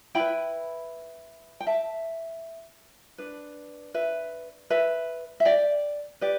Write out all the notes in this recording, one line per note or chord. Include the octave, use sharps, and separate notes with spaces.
E4 B4 G5 B5
G5
E5 A5
D4 B4
B4 E5
B4 E5
E5
D5 G5
G4 B4 D5